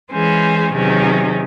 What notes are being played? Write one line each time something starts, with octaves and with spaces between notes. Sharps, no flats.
E3 G#3 C#4 G#4 C5
E2 C3 D#3 F#3 C#4